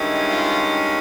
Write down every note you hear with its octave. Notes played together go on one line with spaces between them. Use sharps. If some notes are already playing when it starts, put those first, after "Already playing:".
Already playing: G2 D#3 G#3 C#4 E4
F4